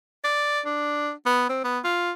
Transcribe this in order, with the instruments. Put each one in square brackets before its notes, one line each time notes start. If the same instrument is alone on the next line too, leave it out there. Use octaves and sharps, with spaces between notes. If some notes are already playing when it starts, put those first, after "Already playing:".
[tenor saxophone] D5
D4
B3
C4
B3
F4